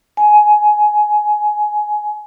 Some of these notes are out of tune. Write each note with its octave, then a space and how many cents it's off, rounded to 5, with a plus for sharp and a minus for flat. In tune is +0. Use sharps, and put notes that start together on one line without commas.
G#5 +15